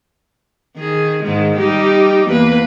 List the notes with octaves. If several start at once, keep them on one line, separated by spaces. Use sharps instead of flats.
D#3 G#4
G#2 D#3 G#3
G3 D#4 G4
E2 A#3 B4